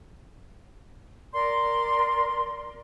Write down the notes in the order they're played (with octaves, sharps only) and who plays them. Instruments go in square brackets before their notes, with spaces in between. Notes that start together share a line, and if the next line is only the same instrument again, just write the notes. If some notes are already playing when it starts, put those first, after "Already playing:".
[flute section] A#4 D5 C6